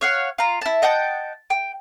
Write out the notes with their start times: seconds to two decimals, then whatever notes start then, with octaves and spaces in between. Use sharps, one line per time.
0.01 C#5 F5 F#5
0.38 F4 A#5
0.61 E4 A5
0.83 D#5 F#5 G5 A5
1.50 G5